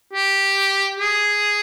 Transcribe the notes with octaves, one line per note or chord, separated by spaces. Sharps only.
G4
G#4